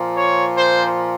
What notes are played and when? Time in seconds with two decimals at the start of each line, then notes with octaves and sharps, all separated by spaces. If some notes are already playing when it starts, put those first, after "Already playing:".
Already playing: A#2 F3
0.16 C#5
0.56 C5